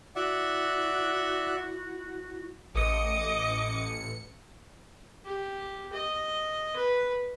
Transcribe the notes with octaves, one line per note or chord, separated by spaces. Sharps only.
E4 F#4 D5 E5 F#5
A1 D#5 D6 D#6 C#7
G4
D#5
B4